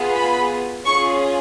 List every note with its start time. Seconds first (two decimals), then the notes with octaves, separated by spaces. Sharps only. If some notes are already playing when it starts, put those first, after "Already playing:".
Already playing: B3 F4 G#4
0.15 B5
0.85 C#4 F4 G#4 C#6